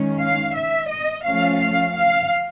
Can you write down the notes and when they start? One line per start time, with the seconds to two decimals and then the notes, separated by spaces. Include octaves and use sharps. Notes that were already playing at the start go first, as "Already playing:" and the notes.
Already playing: D#3 G#3 C#4
0.19 F5
0.56 E5
0.90 D#5
1.26 F3 A3 C#4 F5
1.61 F5
1.97 F5